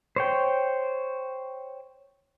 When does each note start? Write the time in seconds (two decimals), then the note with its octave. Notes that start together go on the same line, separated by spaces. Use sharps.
0.16 C5 C#5 G5